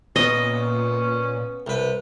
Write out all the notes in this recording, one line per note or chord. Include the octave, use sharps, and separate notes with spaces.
A#2 B3 C#4 D#5
C2 B4